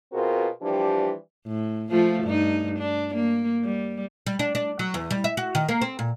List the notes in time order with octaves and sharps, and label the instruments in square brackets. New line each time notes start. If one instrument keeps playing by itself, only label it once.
[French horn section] B2 C4 F4 F#4 G#4 A#4
E3 F3 G3 D4 G4
[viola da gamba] A2
F3 A3 F4
G2 D#4
D4
A#3
G3
[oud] G3
D4
D4
F#3
E2
G3
E5
F#4
D#3
A#3
C4
A#2